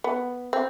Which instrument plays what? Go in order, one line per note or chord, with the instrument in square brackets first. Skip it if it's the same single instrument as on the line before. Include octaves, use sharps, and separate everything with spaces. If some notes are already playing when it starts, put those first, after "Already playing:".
[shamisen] B3
C4